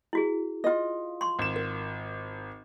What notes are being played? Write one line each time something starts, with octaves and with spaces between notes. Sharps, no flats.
E4 F#4 G#4
F4 D#5
C6 C#6
G#1 E7
A#4